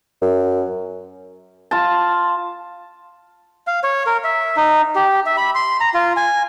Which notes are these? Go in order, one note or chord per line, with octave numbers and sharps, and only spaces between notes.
F#2
F4 A5
F5
C#5
A#4
E5
D#4
G4
E5
B5
C6
A#5
F4
G#5